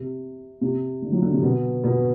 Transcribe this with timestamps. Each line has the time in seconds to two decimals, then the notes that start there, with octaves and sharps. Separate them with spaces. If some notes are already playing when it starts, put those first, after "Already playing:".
Already playing: C3
0.61 C3
1.02 D3
1.12 F#3
1.22 D3
1.33 C3
1.43 B2
1.84 B2